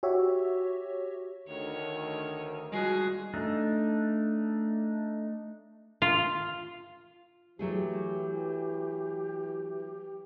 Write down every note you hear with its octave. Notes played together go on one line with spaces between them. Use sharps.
F#4 G4 C#5 E5
D2 D#3 C#5
D#3 F3 G3 G#3 F#4 G#4 F#6
A3 D4 D#4
F4
E3 F#3 A3 G4 G#4